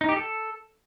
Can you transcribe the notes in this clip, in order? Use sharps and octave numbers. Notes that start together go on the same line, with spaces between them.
D#4
G4
A4